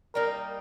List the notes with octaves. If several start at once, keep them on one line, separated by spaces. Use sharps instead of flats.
G3 A#3 D#4 A#4